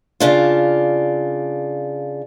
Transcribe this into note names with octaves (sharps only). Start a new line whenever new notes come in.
C#3 D4 F4